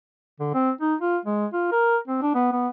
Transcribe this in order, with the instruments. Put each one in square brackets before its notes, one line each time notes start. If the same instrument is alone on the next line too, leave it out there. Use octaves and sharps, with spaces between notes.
[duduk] D3
C4
D#4
F4
G#3
F4
A#4
C4
D4
B3
B3